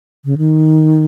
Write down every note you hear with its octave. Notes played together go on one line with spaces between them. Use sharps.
C#3
D#3